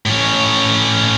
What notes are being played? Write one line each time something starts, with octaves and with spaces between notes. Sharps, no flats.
A2 C#4